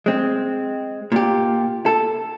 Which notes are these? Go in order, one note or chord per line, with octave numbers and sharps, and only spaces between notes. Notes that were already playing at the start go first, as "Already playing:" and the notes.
G#3 C4
A#2 G4
A4